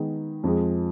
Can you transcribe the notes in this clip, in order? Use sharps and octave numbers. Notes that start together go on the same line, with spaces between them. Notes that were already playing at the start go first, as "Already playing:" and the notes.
Already playing: D#3 G#3 B3 D#4
F2 F3 G#3